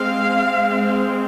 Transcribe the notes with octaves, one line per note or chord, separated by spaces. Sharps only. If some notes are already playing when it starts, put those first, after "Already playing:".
Already playing: G#3 C4 F5
G#3 C4